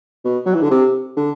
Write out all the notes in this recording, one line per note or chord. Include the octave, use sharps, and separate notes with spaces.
B2
F#3
E3
D3
C3
D3